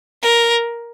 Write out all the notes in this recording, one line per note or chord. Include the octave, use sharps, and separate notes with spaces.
A#4